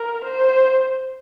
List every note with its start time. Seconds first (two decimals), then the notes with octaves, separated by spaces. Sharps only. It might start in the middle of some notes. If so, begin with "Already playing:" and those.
Already playing: A#4
0.24 C5